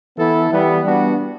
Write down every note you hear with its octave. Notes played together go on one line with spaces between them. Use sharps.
E3 B3 E4 A4
E3 G3 B3
G3 B3 D4 F#4